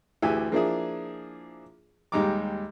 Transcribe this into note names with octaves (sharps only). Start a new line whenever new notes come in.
D2 E3 G4 G#4 E5 G#5
F3 A#3 D4 E4 G#4
D#2 G3 G#3 A#5 D6